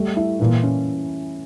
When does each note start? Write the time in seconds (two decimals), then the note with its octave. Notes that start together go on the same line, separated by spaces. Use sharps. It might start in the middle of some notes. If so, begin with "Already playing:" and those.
Already playing: G3 A3
0.17 E4
0.40 A#2 E3
0.63 C#4